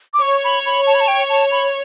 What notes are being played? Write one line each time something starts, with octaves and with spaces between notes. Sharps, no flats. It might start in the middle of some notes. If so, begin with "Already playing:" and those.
D6
C#5 C#6
B5
B5
A5
B5
A5
G5
A5
B5